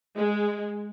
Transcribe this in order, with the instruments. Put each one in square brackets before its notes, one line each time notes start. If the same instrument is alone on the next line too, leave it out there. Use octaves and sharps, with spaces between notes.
[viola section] G#3